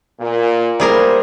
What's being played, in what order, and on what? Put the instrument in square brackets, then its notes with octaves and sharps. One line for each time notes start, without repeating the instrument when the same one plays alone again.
[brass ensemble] A#2
[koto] G3 G#4 A#4 [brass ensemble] A#3 E4 C5